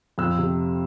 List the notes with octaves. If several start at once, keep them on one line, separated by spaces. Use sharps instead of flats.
F2 E6
C3